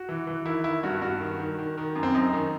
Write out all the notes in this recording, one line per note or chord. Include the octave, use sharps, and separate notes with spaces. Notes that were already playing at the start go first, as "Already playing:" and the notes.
Already playing: F#4
E3
E3
D#3 E4
D#3 E4
G2 F#4
G2 F#4
D#3
D#3
D#3
D#3
F#2
C4
F#2 D#4
D#3